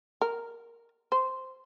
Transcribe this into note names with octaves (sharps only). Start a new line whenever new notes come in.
A#4
C5